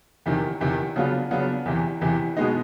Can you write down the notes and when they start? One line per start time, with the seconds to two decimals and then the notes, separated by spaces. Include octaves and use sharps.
0.26 E2 C3 D#3
0.61 E2 C3 D#3
0.96 C#3 F#3 B3 D4 F4
1.31 C#3 F#3 B3 D4 F4
1.66 E2 C3 E3
2.01 E2 C3 E3
2.37 B2 G#3 B3 D#4